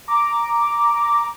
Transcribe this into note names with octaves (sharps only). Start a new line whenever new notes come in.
A#5 D6